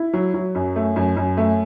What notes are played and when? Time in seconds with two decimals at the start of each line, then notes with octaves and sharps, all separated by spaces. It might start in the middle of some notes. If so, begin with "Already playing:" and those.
Already playing: E4
0.13 F#3
0.34 F#3
0.55 F#2
0.76 A3
0.96 F#2
1.17 F#2
1.37 A3